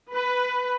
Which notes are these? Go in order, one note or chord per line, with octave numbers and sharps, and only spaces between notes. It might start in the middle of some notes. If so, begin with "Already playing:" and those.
B4